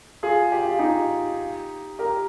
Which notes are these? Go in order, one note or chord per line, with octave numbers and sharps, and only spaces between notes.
F4 G#4
G4
F4
D#4 G4
G4 A#4